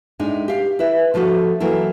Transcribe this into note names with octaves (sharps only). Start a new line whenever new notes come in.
A2 G#3 D4 D#4
G4 F5
E4 B4 E5
D3 F3 A3 F#4 A4
E3 F#3 A#3 E4 A4